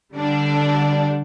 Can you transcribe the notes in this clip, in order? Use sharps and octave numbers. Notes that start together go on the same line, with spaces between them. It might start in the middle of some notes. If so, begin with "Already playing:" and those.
D3 G3 D4